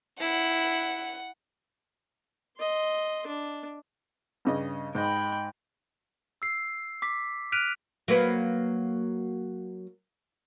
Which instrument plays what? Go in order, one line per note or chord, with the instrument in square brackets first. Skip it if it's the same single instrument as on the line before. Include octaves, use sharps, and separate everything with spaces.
[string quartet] E4 [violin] F#5
[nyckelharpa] D#5 C6
D4
[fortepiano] G2 C#3 D#5
[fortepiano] G#2 D#5 [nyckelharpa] G5 B5
[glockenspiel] E6 C7
D6 B6
F6 F#6 B6 D7 D#7 F7
[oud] F#3 A#3 B4